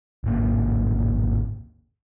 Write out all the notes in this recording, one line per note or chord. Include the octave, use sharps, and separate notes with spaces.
D1 G#1 A#3